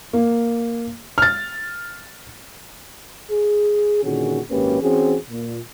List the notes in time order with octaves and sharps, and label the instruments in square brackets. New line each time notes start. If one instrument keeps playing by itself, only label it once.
[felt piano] A#3
F6 A6
[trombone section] G#4
A#2 D3 D#3 C#4 F#4 G#4
G#1 F#2 A#3 C#4 G4 B4
E3 C4 C#4 F#4 G#4
A#2